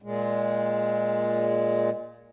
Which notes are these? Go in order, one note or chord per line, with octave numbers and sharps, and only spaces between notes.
A#2 G#3